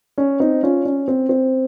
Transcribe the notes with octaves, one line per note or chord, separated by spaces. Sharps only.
C#4
C4 D#4
C#4 F4
C#4
C4
C4